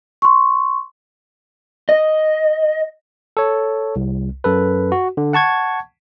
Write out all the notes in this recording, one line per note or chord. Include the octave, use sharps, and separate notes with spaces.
C6 C#6
D#5
A4 C#5
C2
F#2 A4 B4
F#4
D3
F#5 A5 C#6 G#6